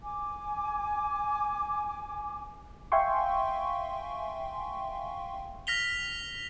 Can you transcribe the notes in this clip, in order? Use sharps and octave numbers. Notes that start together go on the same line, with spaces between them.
G#5 D6
E5 F5 G5 G#5 C6 C#6
F6 A#6 B6 F7 G7